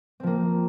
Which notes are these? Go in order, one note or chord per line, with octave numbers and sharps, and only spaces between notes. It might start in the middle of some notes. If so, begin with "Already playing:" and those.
F3 A#3 C4